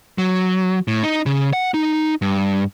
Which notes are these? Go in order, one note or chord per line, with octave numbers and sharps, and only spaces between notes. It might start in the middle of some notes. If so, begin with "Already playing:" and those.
F#3
A2
D#4
C#3
F#5
D#4
G2